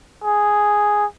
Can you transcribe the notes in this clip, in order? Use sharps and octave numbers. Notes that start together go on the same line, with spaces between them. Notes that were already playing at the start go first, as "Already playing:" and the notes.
G#4